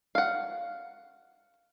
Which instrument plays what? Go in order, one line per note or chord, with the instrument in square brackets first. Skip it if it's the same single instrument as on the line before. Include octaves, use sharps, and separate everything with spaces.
[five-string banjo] F5 F#5